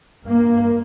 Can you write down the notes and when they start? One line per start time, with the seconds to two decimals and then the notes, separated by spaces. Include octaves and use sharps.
0.24 G2 A#3